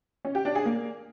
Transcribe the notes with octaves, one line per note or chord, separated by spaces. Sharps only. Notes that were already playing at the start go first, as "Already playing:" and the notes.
C#4
G4
D4
G#4
A#3